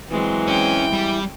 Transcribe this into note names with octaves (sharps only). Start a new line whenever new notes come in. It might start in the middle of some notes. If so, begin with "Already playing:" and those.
E3 F#3 G#3 C4
C#4 G5
G3